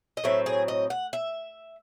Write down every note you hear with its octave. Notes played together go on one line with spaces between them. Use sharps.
D#5
A2 F#3 C4 E5
G#4
D#5
F#5
E5